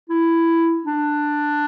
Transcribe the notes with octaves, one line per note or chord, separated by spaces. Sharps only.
E4
D4